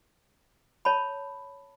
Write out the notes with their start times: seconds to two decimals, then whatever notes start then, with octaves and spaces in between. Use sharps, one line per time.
0.85 C#5 A5 B5